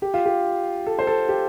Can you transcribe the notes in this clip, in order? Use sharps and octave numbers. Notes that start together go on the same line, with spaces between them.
G4
F4
G4
A4
C5
A4
G4